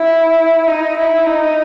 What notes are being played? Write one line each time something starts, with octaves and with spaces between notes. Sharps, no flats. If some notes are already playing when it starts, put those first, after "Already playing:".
Already playing: E4
D#4
E4
D#4